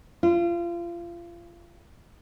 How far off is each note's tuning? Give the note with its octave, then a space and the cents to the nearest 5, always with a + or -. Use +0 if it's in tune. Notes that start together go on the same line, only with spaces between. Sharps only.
F4 -30